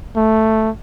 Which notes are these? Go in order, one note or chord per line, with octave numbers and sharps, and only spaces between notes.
A3